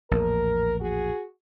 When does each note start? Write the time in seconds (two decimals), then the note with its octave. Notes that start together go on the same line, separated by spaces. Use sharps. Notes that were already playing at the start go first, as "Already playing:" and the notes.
0.11 A#1 E2 A2 A#4
0.80 F#4 G#4